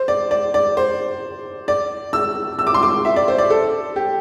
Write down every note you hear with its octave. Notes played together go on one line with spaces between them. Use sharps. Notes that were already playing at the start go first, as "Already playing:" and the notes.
Already playing: C5
D5
D5
D5
C5
D5
E6
E6
D6
C6
D6
E5
D5
C5
D5
A4
G4